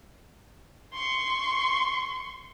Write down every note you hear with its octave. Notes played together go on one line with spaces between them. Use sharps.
C6 C#6